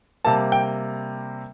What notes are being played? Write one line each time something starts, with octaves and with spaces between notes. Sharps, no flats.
C3 G3 A#3 A5
G5